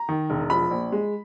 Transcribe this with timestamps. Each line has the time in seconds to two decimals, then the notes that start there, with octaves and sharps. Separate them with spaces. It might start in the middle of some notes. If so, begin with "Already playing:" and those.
Already playing: A#5
0.09 D#3
0.30 E1
0.50 F3 B5
0.71 A#1
0.92 G#3